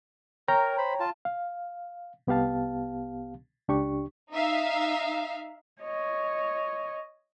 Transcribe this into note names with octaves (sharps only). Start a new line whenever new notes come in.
A#4 C#5 G5 A#5
C5 B5
F4 A5
F5
C2 B3 G4 F5 A5
C#2 D4 G4 C#6
D#4 E5 F5
C#5 D#5